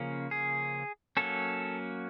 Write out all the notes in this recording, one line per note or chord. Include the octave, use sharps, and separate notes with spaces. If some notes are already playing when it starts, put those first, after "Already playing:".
Already playing: C#3 F3 A#3 C#4
G#4
F#3 A#3 C#4 A4